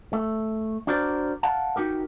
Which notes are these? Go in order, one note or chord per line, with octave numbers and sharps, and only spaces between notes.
A3
D4 F#4 A#4 C5 D5
F5 F#5 A5
D#4 F#4 G4 A#4